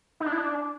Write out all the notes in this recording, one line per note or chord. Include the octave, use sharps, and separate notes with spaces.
D#4
D4
E4
D4